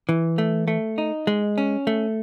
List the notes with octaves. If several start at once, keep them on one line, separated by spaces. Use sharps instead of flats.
E3
A3
A3
D#4
G#3
C#4
A3